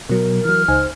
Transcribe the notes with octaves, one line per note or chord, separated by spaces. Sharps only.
B2 F#3 A#4
E3 F#3 F6
C#2 D#4 C5 G#5